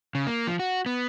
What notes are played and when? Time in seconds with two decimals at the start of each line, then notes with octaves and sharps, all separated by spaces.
0.15 C#3
0.27 A#3
0.47 F3
0.60 F#4
0.86 B3